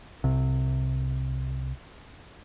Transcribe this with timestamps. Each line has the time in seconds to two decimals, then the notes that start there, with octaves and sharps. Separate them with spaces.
0.24 C2 C3